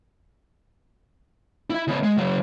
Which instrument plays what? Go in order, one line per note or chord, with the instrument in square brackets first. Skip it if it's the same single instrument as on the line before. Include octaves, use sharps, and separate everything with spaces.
[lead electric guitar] E4 E5
C#3 B3
G#3
C#3 F#3